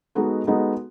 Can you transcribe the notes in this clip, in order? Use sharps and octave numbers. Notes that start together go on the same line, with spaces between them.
G#3 B3 D#4 F#4 A4
G#3 B3 D#4 F#4 A4